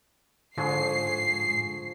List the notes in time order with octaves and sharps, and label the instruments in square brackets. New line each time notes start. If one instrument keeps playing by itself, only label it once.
[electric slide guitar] G#2 [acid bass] D3 [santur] F3 G#4 C#6 [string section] C7